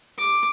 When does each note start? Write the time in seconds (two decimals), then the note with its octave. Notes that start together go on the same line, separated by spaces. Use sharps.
0.19 D6